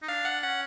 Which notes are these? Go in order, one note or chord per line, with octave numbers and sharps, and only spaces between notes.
D#4
D4 F5
F#5
C#4 F#5